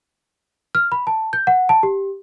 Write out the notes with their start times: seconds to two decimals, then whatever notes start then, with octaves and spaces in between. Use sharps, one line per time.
0.75 F6
0.92 B5
1.07 A5
1.33 G6
1.47 F#5
1.69 A5
1.83 G4